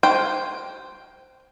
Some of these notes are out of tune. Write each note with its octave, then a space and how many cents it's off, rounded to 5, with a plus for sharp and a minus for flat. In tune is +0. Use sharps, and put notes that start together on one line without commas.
F#4 +35 C5 +0 G5 +0